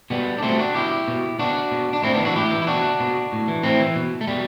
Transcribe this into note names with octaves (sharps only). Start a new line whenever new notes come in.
B2 G3 B3
D4
B2 A3 C4
D4 F#4
B2 E4 G4
B2
B2 D4 F#4
B2
D4
A2 C4 E4
E3 B3 D4
D4 F#4
A2 E4 G4
E3
E4
B2 D4 F#4
B2
A2
E3
A2 C4 E4
E3
B2
A3
B2 G3